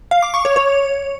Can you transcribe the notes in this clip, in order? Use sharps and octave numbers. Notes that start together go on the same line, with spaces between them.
F5
D6
C#6
C#5
C#5